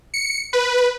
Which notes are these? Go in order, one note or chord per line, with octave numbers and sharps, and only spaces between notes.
C#7
B4